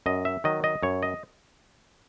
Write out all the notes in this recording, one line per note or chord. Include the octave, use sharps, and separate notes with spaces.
F#2 D#5
E5
D#3 F#3 D#5
D#5
F#2 C#5
D#5